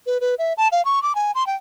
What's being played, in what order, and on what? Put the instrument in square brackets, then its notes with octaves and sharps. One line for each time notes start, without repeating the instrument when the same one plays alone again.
[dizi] B4
B4
E5
A5
F5
C#6
D6
G#5
C6
G5